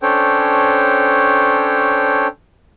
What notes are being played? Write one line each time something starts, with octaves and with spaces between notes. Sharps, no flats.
C#4 D4 A4 C5 C#5 G5